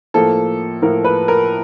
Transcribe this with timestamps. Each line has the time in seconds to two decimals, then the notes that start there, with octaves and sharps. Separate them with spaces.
0.14 A2 F3 A#3 A4
0.82 A2 F3 A#3 A#4
1.04 B4
1.28 A#4